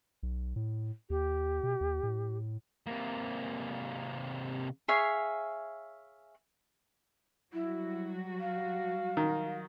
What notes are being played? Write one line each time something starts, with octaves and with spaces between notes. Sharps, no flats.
B1
A2
D#2 G4
B2
D#2
A2
C3 A#3
G#4 C#5 E5 F5
F#3 G3 E4 F#4
F5
D#3